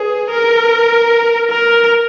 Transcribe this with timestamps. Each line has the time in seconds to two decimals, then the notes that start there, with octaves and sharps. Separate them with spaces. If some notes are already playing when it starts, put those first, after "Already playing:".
Already playing: G#4 B4
0.31 A#4
1.50 A#4